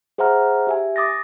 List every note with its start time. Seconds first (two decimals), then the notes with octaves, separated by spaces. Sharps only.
0.18 G#4 C5 E5 F#5 A#5 F6
0.67 G4 E5 G#5
0.96 D6 D#6 A6 A#6